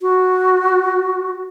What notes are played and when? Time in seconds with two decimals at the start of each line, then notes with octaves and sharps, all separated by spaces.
0.01 F#4